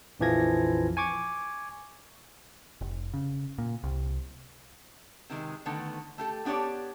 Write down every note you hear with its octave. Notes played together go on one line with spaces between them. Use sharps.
A#1 F2 E3 F3 G#6 A#6
G#5 C#6 D6 G#6
F1
C#3
A#2
C2
C3 D#3 G#3
D3 D#3 A3 B3
A3 G4 A4
B3 D4 G4 C#5 D5